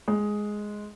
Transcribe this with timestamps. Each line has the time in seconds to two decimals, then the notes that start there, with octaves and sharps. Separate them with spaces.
0.08 G#3